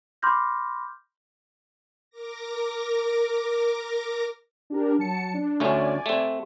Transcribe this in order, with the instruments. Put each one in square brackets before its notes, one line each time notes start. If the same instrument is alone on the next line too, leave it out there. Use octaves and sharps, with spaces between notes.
[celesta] B5 C6 D6 F6 G6 A#6
[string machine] A#4 D6 A#6
[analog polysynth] D4 G4 A#4
F#3 A5 C#7
D4
[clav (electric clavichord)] D2 A3 C#4 [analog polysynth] D5 G#5
[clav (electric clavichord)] A3 C4